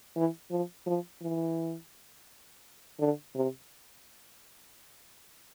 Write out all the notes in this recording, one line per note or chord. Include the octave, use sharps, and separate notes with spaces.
E3
F3
F3
E3
D3
C3